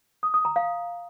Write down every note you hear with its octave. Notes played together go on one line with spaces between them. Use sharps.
D#6
D#6
A#5
F5